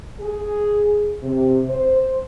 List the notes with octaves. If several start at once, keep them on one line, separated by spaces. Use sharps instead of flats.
G#4
C3
C5